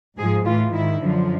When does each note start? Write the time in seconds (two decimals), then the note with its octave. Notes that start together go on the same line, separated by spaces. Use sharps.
0.18 G#2 F3 G#4
0.45 A2 E3 F4
0.74 G#2 D#3 E4
1.02 F#2 D3 F3